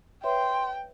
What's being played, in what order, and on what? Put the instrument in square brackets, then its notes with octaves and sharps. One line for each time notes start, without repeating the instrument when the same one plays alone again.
[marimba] B4 C#5 E5 [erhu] G5 [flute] C6